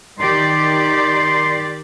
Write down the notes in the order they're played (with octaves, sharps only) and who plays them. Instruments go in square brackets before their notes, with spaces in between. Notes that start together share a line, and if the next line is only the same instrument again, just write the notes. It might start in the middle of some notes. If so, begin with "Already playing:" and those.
[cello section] D#3 G4 D5 [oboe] C6